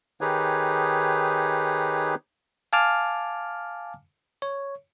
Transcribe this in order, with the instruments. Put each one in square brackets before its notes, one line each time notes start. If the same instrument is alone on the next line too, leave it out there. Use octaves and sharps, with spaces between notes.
[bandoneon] D#3 D#4 G4 G#4 B4 C#5
[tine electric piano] F5 G#5 A5 D6 F6
C#5